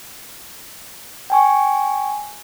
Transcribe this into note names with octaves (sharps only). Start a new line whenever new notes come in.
G5 G#5 C#6